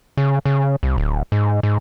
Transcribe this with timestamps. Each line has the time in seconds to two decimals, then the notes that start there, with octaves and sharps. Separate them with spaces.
0.17 C#3
0.45 C#3
0.83 C2
0.98 D1
1.32 G#2
1.63 G#2